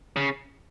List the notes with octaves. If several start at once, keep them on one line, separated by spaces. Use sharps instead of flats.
C#3